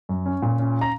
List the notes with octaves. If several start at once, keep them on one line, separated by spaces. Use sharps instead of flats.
F#2
C#4
A#2
C#4
A#5